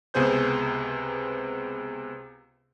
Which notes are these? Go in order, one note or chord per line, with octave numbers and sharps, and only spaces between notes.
C#2 C3 B3 G#4 C5 G6